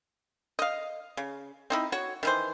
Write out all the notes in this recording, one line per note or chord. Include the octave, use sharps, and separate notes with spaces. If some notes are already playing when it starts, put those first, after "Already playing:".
D#5 F5
C#3
C4 D#4 E4
F#4 C#5
D#3 E3 C5